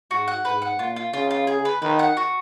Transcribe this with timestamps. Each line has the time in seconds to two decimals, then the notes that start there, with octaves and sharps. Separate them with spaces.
0.11 G#2 F#4
0.28 F#5
0.45 G#2 B4
0.62 F#5
0.79 A#2 F4
0.96 F4
1.13 C#3 F4
1.31 F4
1.47 G#4
1.65 B4
1.82 D#3 B4
1.99 F#5
2.17 F#4